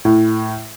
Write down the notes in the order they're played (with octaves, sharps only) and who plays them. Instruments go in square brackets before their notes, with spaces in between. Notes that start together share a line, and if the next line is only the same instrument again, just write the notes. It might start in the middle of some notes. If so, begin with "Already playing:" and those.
[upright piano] A2